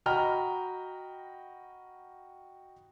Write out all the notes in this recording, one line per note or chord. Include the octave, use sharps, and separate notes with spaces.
F#4 D#5 G5 A#5 B5 F6